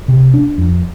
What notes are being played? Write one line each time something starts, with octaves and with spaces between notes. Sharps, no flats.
C3
D4
F2